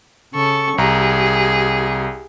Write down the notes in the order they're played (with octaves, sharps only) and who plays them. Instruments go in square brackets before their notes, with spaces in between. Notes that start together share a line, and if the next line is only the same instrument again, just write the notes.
[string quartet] C#3 A4 C#6
[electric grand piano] C2 A#5 [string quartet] G4 G#4